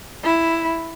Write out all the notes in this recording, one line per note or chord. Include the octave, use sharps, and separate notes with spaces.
E4